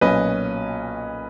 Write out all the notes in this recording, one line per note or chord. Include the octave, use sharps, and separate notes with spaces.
B1 A#2 F#3 C#4 B4 D#5